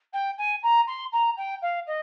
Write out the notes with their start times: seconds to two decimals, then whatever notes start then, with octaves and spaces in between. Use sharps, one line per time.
0.13 G5
0.38 G#5
0.63 A#5
0.87 C6
1.12 A#5
1.37 G5
1.62 F5
1.86 D#5